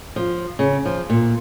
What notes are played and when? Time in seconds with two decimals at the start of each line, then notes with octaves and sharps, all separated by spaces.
0.16 F3
0.59 C#3
0.85 F3
1.10 A#2